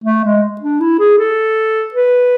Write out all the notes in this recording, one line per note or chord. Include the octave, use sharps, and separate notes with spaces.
A3
G#3
D4
E4
G#4
A4
B4